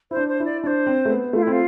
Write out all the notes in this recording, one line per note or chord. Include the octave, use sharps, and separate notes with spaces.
E4 C5
D4
C5
E4 D5
D4 C5 D5
C4
A3
B3
A3 F4
E4
C4
F4